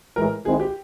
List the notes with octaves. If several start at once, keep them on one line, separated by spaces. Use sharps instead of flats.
A2 E3 G#3 A#4
D#3 G#3 C4 E4 G#4
G4